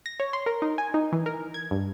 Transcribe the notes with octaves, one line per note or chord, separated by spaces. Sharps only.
A#6
C#5
C6
A#4
D#4
G#5
D#4
E3
A#4
G#6
G2